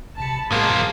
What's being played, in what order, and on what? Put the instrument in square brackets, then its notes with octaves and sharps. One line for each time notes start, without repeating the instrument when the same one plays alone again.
[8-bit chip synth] A#1 C3 C#7 [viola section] A5 B5
[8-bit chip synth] F2 A2 [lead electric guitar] F#3 C4 [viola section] G#3 A5 [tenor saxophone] A#3